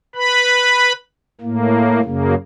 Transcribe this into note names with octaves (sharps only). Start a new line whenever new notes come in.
B4 B5
A2 A#3
F#2 C#3 A#3